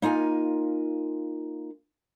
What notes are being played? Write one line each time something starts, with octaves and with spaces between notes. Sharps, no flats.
A#3 D#4 F4 G#5